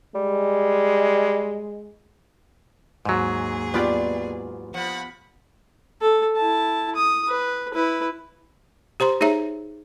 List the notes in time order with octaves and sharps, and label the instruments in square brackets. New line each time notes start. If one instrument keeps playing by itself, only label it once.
[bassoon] G3 [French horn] G#3
[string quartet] D#2 G#4 [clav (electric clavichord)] G#2 F#3
[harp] B3 F4 G4 [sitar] D5
[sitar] F3 [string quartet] F#5 B5
[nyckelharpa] A4
E4 A5
D#6
B4
E4 B4
[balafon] G4 C5 A#5 C6
D#4 G#4 C#5 E5 A#5